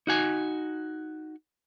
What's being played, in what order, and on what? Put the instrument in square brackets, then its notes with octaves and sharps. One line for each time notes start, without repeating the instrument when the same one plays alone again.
[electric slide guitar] D#4 F#4 G#5